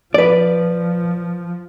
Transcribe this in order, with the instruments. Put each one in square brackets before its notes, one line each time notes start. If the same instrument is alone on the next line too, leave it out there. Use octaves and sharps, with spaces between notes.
[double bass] F3 [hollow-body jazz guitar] B4 D5